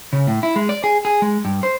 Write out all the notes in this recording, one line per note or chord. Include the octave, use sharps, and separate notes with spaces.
C#3
A2
E4
G#3
D5
G#4
G#4
G#3
G2
C5